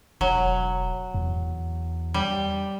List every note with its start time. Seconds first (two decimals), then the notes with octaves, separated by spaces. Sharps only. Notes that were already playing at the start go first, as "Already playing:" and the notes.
0.21 E1 F#3
1.14 E2
2.14 G3